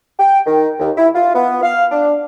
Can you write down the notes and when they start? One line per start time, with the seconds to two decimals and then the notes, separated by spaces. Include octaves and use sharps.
0.19 G5
0.46 D#3
0.79 D#2
0.97 E4
1.14 F4
1.34 B3
1.63 F5
1.91 D4